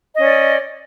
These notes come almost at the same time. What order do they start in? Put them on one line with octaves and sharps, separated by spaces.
D#5 C#4 D5